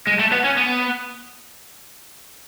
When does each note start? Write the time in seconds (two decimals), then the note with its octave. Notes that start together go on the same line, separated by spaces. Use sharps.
0.07 G#3
0.19 A3
0.32 B3
0.44 C#4
0.57 B3